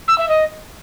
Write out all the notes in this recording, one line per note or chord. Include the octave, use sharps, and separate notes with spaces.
E6
E5
D#5